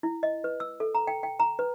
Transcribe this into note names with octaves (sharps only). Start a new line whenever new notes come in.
E4
D#5
B4
E6
A4
A#5
G5
G5
A#5
B4